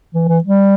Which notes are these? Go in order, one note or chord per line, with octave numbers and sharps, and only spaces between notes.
E3
E3
G3